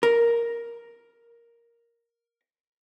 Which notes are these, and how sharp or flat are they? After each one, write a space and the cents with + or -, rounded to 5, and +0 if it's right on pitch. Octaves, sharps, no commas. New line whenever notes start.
A#4 +5